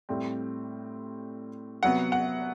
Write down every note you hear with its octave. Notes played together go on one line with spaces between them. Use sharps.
A2 G3 C4
C3 F#3 B3 F#5
F#5